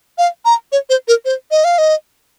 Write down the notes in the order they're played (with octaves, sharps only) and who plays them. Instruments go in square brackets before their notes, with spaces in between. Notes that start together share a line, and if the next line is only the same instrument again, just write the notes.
[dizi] F5
A#5
C#5
C5
A#4
C5
D#5
F5
D#5